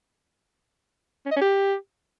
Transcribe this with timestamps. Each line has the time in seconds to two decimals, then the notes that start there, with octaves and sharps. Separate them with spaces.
1.26 C#4
1.31 D#5
1.36 C#4
1.41 G4